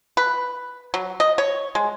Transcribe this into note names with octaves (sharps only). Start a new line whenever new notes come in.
B4
F#3
D#5
C#5
G#3